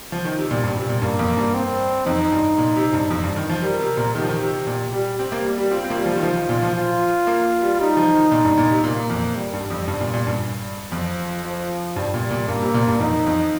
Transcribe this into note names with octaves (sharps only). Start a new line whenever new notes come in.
F3
D#3
C3
A#2 G3
G2
C3
A#2
G2 A#3
F2
G2
C4
F2 D#4
G2
A#2
C3
G2
F2
G2
D#3
F3
G3 A#4
C3
A#2
D#3 G4
F3
D#3
C3
A#2
G3
C4 G4
A#3
G3
G3
C4 F4
C4
A#3
G3
F3
G3
D#3
F3
D#3
A#2
F3
F4
A#3
G3
G3 D#4
F3
D#3
A#2
G2
A#2
C3
A#2 A#3
F2
G3
G2
F2
G2
A#2
A#2
G2
F2 F3
F3
G2 G3
A#2
A#2
G2 A#3
C3
A#2
G2
F2 D#4
F2